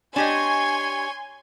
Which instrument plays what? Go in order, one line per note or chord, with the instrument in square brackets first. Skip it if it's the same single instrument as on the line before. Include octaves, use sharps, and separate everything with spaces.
[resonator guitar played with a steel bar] D4 G4 D#5 [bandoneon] C#5 C#6 [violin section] G#5 C6 G#6